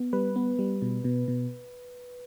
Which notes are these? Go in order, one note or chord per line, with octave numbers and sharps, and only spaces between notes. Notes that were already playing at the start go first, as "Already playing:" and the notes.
Already playing: B3
G3 B4
B3
G3
B2
B2
B2